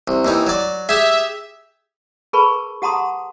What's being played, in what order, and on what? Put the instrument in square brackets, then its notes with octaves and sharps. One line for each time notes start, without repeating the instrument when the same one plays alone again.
[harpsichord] C2
D#2 E3 D#4
F#3 D5
[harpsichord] G4 G#4 [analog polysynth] E5
[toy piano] G#4 A#4 B4 A5 B5 C#6
G4 F#5 A5 A#5 C6 D#6